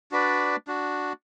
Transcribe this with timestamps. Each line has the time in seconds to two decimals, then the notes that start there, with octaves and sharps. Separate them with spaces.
0.12 D4 F#4 B4 D5
0.67 D4 F#4